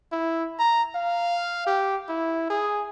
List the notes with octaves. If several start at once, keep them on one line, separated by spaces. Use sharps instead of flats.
E4
A#5
F5
G4
E4
G#4